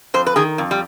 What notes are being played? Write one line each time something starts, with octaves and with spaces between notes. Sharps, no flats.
F2 C5
B4
D#3 G#4
F2
G3